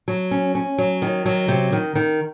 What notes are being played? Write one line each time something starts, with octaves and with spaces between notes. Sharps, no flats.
F#3
C#4
C#4
F#3
D#3
F#3
C3
D#3
D#3